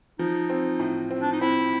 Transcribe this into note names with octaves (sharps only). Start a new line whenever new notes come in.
F3 D#4
C4
A2
C4
D4
D#4
C4 E4